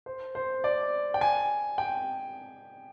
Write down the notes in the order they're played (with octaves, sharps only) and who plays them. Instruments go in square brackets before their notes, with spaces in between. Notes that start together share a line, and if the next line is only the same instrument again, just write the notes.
[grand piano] C5
C5
D5
G5
G#5
G5